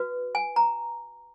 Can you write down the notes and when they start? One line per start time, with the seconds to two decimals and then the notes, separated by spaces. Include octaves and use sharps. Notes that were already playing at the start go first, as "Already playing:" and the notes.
Already playing: F#4 B4
0.35 G#5
0.56 A#5